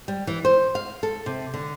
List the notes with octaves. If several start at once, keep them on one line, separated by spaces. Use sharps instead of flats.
G3
E3
C5
F5
A4
C3
D3